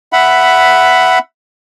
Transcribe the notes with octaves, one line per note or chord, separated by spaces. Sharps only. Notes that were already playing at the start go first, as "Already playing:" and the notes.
E5 F#5 B5